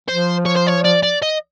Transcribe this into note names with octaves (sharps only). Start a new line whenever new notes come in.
F3 C5
C#5
C5
C#5
D5
D5
D#5